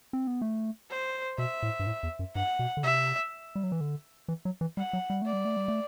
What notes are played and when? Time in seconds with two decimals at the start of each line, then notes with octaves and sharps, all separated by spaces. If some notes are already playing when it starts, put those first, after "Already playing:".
0.13 C4
0.27 B3
0.42 A3
0.90 C5
1.38 B2 E5
1.63 A2
1.79 G2
1.87 A2
2.03 E2
2.19 F#2
2.35 G2 F#5
2.59 B2
2.77 D3
2.83 C3 E5
3.55 G3
3.63 F#3
3.72 E3
3.81 D3
4.28 E3
4.45 F#3
4.61 E3
4.77 G3 F#5
4.93 F#3
5.10 G3
5.22 A3 D5
5.33 G3
5.45 A3
5.57 G3
5.68 A3